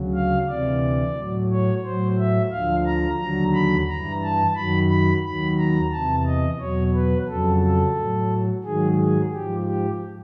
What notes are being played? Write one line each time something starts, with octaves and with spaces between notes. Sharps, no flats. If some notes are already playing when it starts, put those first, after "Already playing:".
Already playing: D2 C#3 F#3
F5
D2 C3 E3 D5
A2 F#3
C#5
A2 F#3 C5
E5
D2 D3 F3 F5
A#5
D#2 D3 F#3 A#5
B5
G2 A#5
E3
A5
F#2 D#3 F#3 B5
B5
D#2 D#3 F#3 B5
A#5
E2 C3 E3 A5
D#5
E2 B2 F#3 C#5
B4
F2 C#3 F#3 A4
A4
A2 F#3
G#2 D#3 F#3 G#4
G#4
G#2 F3 G4
G4